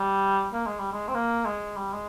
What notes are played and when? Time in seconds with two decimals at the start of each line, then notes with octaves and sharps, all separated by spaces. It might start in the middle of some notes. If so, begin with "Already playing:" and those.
Already playing: G3
0.53 A#3
0.66 G#3
0.79 G3
0.92 G#3
1.08 C4
1.14 A#3
1.45 G#3
1.76 G3
1.93 G#3